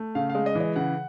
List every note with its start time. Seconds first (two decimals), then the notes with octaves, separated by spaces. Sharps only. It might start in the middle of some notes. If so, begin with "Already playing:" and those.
Already playing: A3
0.15 C#3 F5
0.30 F5
0.35 G#3
0.46 D#5
0.55 E3
0.60 D#5
0.76 C#3 F#5